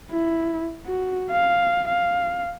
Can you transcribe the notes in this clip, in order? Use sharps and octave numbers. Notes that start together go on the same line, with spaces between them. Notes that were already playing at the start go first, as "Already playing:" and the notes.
E4
F#4
F5
F5